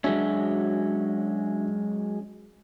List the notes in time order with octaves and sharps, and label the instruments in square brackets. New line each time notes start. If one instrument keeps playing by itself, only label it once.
[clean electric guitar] F#3 G#3 C#4 [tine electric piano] D4 F#4 E5